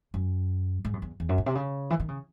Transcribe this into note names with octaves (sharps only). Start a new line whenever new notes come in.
F#2
G#2
F#2
E2
E2
F#2
A2
C3
C#3
E3
D#3
C#3